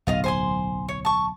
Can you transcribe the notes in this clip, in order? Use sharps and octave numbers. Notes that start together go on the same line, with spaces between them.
D1 B1 F4 D#5 F5
C5 G#5 C6
C#5
A5 C#6